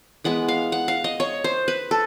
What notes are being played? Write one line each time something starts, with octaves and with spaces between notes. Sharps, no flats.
E3 G#3 B3 F#5
F5
F#5
F5
D#5
C#5
C5
B4
A4